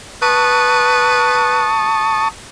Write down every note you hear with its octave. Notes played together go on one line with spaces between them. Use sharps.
B4 A5 C#6 D#6